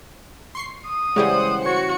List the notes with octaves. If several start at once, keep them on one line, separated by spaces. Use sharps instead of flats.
C6 C#6 C7
D#6
C#3 E3 G3 G#3 G4 G#4 C5 F#5
F#4 C#5 C#7